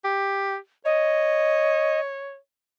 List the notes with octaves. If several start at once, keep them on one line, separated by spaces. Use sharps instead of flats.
G4
C#5 D#5